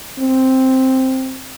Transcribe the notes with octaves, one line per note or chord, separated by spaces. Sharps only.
C4